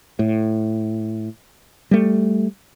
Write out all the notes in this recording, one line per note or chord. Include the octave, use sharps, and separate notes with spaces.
A2
G3 A3